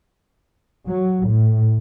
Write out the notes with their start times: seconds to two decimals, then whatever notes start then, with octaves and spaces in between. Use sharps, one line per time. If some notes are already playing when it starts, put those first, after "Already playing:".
0.88 F#3
1.26 A2